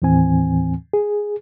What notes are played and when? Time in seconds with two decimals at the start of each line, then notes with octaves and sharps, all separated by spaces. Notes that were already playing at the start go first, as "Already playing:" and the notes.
0.02 D#2 A2 E3 C4 G#5
0.93 G#4